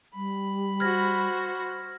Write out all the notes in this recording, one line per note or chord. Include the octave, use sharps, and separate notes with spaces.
G3 B5
F#4 C5 F6 G#6 A#6